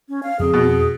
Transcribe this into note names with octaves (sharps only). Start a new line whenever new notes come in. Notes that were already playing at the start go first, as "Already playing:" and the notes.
C#4
F5
F2 C4 G#4
B2